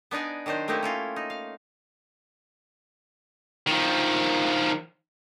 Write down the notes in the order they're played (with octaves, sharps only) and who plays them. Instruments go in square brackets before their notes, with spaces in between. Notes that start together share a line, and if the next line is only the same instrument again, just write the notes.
[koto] B3 D4 D#4 D5 G#5
D#3 F#3 D4 D#4 C5
A3 A#3 C4 D#4 E4 G4
C#4 E4 F4
D#4
F5
[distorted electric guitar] D#3 F3